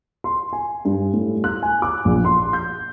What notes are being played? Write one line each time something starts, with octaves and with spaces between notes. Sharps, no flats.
C6
G#5
G2
A2
F#6
G#5
D6
A#1
C6
G6